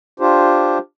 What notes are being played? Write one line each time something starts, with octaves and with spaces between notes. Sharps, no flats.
D4 F4 G4 C5